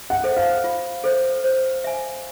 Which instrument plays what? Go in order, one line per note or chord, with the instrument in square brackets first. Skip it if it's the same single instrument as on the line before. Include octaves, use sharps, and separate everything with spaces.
[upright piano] F#5
[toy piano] A4 C5 E5
[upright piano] F5
[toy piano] F4
A4 C5 E5
C5
E5 G#5